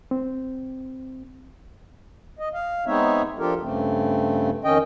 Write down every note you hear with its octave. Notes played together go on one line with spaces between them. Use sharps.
C4
D#5
F5
G#3 B3 C4 D#4 C#5 E5
F3 D4 F4 G4 A4 A#4
G2 C#3 A3 C4
F2 D#3 C#4 D#5 G5